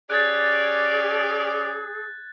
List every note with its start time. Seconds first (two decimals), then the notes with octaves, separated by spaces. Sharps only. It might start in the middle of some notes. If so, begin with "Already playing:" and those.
0.10 C#4 G4 G#4 D5 F#6 G#6 A6